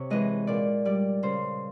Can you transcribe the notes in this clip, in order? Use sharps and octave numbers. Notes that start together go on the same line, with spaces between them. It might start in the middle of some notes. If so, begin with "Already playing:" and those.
Already playing: C3 C#5
E3 G#3 D#5
A#2 D5
G3 D5
C#3 C5